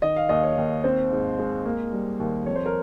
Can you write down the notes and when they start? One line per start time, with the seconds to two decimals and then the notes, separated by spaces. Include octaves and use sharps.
0.02 D#3 D#5
0.16 F5
0.29 D#2 D#5
0.43 C#5
0.57 D#2
0.84 C4 C5
1.11 G#2
1.39 G#3
1.65 A#3
1.93 G3
2.20 D#2
2.46 F2 C#5
2.55 C5
2.65 A#4